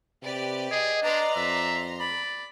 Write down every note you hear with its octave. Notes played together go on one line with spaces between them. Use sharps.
C3 G4 B4 D5
G#4 D#5
D4 B4 D5 A#5 C6
F2 E5
D5 B5